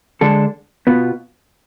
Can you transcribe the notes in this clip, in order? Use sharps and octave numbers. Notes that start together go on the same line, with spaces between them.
D3 G#3 D4 A4
B2 B3 F4